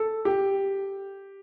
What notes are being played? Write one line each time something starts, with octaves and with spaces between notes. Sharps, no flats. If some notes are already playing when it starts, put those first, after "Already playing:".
Already playing: A4
G4